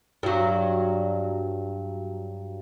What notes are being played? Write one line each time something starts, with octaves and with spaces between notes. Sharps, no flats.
G2 F#3